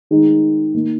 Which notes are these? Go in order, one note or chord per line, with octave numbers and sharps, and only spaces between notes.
D#3 G#3 D#4
D#3 A#3 D#4